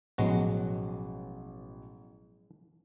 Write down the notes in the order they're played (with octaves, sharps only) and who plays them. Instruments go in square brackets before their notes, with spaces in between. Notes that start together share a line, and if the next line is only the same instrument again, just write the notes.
[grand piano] A1 B2 [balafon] F3 [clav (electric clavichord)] F#3 G#3 F#4